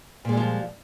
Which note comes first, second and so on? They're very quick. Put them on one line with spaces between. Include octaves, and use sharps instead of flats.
A#2 G#3 G3 F3